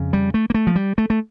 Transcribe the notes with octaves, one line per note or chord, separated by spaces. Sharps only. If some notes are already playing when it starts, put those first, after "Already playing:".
Already playing: F2 C#3
G3
A3
A#3
A3
F3
G3
A3
A3